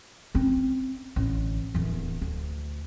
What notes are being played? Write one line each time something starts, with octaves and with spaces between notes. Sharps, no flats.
C4 C#4
A1 D3
D1 E2
D2